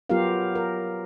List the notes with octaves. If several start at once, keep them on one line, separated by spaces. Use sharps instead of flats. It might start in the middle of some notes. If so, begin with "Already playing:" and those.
F#3 B3 F4 G4 A#4 F5
A#4